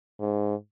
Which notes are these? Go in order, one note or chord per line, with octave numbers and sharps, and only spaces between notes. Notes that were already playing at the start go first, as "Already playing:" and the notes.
G#2